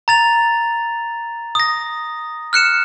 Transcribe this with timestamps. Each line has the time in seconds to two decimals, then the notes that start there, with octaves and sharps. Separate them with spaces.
0.08 A#5 A6 F7
1.55 D#6 A#6
2.53 F6 F#6 C#7 E7